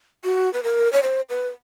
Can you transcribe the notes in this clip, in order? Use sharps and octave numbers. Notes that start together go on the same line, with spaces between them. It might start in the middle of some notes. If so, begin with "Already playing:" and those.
F#4
B4
A#4
C#5
C5
B4